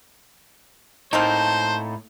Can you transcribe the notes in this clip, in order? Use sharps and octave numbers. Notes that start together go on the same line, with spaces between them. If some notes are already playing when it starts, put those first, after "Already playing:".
A2 A#3 C4 D#4 C5 A5